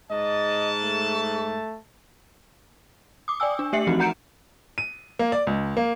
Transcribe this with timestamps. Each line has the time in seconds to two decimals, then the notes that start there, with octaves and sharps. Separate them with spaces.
0.11 G#2 D#5 A5
0.84 A3
3.28 D6 D#6
3.40 D5 G5 G#5 E6
3.59 D4
3.73 A3 G4 E5 C7 C#7 F#7
3.87 E3 F3 C4 D#4 F#4
3.99 F#5 A#5 G6 C#7 D7 E7
4.78 D#7
5.19 A#3
5.32 D5
5.47 C#2
5.77 A#3